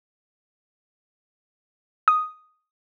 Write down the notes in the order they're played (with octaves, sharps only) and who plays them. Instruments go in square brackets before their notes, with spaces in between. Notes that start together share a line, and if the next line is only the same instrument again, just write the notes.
[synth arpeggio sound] D#6